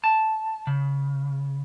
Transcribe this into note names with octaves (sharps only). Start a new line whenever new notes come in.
A5
C#3